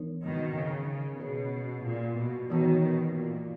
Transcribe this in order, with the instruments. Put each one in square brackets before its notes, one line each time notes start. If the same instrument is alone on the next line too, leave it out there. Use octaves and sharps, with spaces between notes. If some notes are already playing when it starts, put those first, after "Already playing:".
Already playing: [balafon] E3 B3 D#4 A#4 C#5
[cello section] B2 D#3
C#3
C#3
[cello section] B2 [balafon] C#4 G#4 C#5
[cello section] A#2
B2
[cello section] B2 D#3 [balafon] E3 B3 F#4 C#5
[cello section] B2
A#2